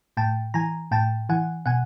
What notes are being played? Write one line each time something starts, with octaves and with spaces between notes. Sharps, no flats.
A2 G5 A5
E3 G#5 A#5
A2 G5 A5
E3 F#5 G#5
B2 F#5 G#5